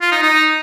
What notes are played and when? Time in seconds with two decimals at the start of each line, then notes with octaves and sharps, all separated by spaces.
0.01 F4
0.12 D#4
0.23 D#4